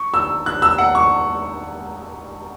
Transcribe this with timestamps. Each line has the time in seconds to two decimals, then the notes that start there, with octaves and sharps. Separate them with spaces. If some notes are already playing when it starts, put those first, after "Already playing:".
Already playing: C#6
0.14 E6
0.46 F#6
0.62 E6
0.78 F#5
0.95 C#6